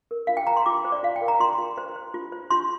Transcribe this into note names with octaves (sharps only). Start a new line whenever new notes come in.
A#4
F4 F5
G5
C5 A#5
C6
F4 D6
C5
D5
F4 F5
G5
A#4
A#5
F4 C6
F4
C5
C5
F4
C5
F4 C6